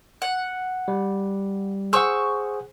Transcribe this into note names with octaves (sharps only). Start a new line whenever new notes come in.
F#5
G3
G#4 C5 F#5 C#6 E6